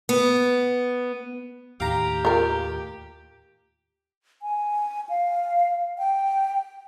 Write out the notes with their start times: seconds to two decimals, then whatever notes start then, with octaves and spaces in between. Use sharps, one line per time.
0.09 B3
1.80 D#2 A2 D#3 G4 F5 A#5
2.25 F4 A#4
4.42 G#5
5.09 F5
5.98 G5